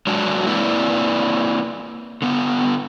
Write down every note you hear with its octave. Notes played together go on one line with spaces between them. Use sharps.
F#3 G#3 D4 F#4
A#3 C4 E4 B4 D5
D3 B3